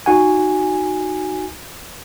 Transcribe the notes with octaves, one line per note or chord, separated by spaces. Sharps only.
D#4 F#4 F#5 G#5